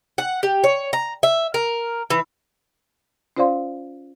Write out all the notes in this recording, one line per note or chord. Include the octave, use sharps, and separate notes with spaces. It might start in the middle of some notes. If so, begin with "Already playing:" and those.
F#5
G4
C#5
A#5
E5
A#4
E3
C#4 F4 C5 D5 F5 C6